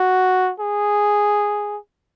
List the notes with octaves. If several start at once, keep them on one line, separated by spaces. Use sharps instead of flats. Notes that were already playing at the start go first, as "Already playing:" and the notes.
Already playing: F#4
G#4